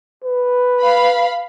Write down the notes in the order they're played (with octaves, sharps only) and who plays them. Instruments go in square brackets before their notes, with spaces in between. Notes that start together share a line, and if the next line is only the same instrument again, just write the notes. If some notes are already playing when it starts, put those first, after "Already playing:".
[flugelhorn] B4
[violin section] F5 B5